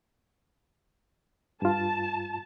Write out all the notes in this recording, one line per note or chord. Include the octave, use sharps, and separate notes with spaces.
G2 F4 A5